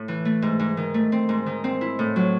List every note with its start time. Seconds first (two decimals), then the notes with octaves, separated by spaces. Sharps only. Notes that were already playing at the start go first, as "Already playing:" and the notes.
Already playing: A2
0.08 E3
0.25 A3
0.42 G#2
0.60 G#2
0.77 D#3
0.94 A3
1.12 C4
1.29 G#2
1.46 D#3
1.64 C4
1.81 E4
1.99 A2
2.16 F#3